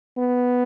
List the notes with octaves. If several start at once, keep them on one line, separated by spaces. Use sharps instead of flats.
B3